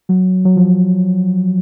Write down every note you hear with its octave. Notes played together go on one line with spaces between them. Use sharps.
F#3
F#3
F3